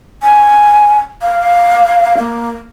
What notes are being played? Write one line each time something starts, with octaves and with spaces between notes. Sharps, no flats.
G#5
F5
A#3